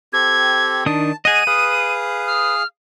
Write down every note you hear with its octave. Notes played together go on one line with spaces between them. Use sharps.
C4 G4 A4 G#6
D#3 D4 A5 D#6
G#4 D#5 F#5 D#7
G#4 B4 F5 D#6
F6